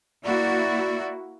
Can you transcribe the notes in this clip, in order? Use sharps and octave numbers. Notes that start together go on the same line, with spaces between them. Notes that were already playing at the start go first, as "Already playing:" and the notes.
A#3 E4 F#4 D5